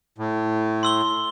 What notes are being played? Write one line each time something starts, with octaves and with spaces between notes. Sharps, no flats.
A2
C6 E6 G7